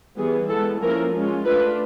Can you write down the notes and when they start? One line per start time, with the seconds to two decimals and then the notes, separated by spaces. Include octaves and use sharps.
0.18 E3 G3 B3 G#4
0.49 G#3 B3 E4 A4
0.81 F3 A#3 C#4 E4 A#4
1.13 G#3 C#4 F4
1.45 A3 D4 F4 B4